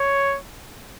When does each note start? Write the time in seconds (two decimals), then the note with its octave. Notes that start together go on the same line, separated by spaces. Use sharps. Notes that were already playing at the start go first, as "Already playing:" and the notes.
Already playing: C#5